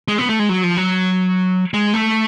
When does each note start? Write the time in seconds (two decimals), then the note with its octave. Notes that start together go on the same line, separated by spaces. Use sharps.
0.08 G#3
0.18 B3
0.29 A3
0.39 G#3
0.49 F#3
0.63 F3
0.77 F#3
1.74 G#3
1.94 A3